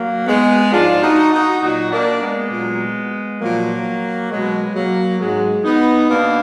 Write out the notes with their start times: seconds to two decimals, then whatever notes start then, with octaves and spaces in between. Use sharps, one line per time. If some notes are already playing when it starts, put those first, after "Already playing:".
Already playing: F#3 A#3
0.27 G#3 B3
0.72 G#2 F3 D4 F4
1.02 D#4 F#4
1.32 D#4 F#4
1.62 A#2 F#3 D#4 F#4
1.92 A#3 D4
2.22 G#3 B3
2.51 A#2 F#3
3.41 A#2 F3 F#3 A#3
4.31 B2 F#3 G#3
4.75 F#3 A#3
5.20 G#2 F#3 G#3
5.64 B3 D#4
6.09 B2 A#3 D4